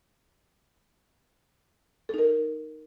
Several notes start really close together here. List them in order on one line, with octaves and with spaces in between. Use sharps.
A4 D#4 A#4